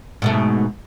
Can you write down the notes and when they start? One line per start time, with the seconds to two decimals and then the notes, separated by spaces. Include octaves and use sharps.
0.22 G#2 B2 A3